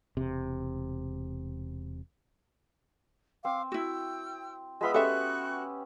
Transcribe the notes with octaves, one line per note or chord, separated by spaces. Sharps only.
E1 C3
C4 F5 D6
E4 F#4 G5 E6
G#3 B3 F4 E5 B5 C6
C#4 F#4 G4 A4 E5 C#6 F#6